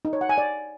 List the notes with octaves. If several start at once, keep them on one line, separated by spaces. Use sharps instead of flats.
D#4
C#5
F#5
G#5
D5